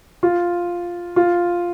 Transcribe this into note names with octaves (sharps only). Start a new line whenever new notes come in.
F4
F4